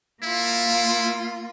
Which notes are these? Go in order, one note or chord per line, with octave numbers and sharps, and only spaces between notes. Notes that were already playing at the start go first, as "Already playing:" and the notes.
A#3 E4 F4